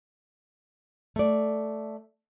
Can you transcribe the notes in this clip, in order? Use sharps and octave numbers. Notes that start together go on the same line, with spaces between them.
A3 D5